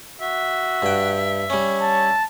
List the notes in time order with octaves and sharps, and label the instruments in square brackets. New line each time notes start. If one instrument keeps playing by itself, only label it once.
[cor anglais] F#4 [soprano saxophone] E5
[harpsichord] G2 G5
[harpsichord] G3 C#4 [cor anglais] C#5
[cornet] A5